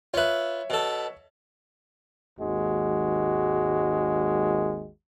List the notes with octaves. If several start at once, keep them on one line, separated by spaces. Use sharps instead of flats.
F4 B4 C#5 E5
B2 A4
G#1 D#2 G#3 F#4